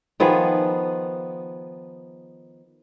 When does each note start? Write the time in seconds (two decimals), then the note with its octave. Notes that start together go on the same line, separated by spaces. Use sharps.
0.20 D#3 F3 B3 G#4